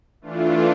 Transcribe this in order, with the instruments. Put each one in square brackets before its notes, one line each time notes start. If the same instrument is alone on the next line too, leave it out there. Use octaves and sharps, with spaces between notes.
[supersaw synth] E3 A3 D4 F4